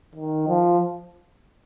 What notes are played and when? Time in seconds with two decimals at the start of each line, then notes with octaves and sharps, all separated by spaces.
0.15 D#3
0.48 F3